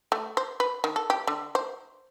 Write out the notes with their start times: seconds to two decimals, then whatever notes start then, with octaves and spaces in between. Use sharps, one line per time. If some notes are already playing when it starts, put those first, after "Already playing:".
0.12 A3
0.37 C5
0.60 B4
0.84 D#3
0.96 A4
1.10 G4
1.27 D3
1.55 C5